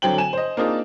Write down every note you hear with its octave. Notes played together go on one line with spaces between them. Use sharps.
D3 F#3 C4 G5 F#7
G#5 E7
C5 D#5
A#3 C4 D4 D#4 F4 G#4